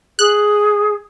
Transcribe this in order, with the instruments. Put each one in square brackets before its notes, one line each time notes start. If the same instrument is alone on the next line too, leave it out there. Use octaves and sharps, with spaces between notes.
[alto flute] G#4 [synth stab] F#6